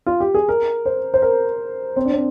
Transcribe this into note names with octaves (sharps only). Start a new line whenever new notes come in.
F4
G4
G#4
A#4
C5
C5
A#4
C4
D4
C4